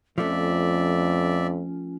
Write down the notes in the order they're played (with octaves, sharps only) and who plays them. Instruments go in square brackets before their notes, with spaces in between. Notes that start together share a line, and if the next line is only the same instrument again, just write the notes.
[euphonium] F2 [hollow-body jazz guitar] F3 A3 [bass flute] C#4 [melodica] D5 E5